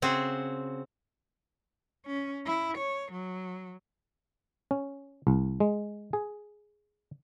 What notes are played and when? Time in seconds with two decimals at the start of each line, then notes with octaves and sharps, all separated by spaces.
0.02 C#3 C4 F#4 G#4
2.06 C#4
2.46 E4
2.78 C#5
3.12 F#3
4.71 C#4
5.27 C2
5.60 G#3
6.13 G#4